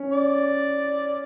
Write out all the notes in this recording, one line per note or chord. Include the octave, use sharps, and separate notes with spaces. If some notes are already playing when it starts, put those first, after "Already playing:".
Already playing: C#4
D5